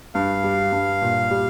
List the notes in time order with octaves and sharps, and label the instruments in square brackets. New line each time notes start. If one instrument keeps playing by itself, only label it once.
[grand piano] G2 [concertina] F5
[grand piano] G3
G2
A#2
G3